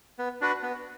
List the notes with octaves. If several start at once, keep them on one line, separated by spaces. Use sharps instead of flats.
B3
D4 F#4 B4
B3